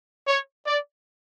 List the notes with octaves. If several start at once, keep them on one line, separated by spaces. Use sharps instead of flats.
C#5
D5